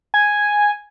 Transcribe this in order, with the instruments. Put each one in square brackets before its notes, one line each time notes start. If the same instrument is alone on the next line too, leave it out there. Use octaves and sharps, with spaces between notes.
[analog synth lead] G#5